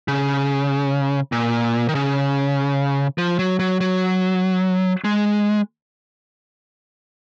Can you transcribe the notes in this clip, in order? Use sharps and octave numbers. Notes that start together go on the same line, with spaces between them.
C#3
A#2
D#3
C#3
F3
F#3
F#3
F#3
G#3